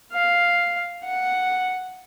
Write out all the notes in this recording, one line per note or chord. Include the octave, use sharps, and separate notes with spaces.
F5
F#5